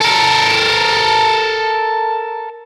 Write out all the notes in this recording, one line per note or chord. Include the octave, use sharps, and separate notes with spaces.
A4 A#4